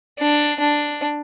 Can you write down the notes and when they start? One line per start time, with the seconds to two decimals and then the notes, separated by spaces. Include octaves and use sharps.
0.19 D4
0.60 D4